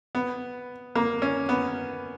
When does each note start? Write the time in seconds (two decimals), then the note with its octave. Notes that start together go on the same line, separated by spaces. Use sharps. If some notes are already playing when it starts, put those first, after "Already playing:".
0.15 B3
0.96 A#3
1.22 C#4
1.49 B3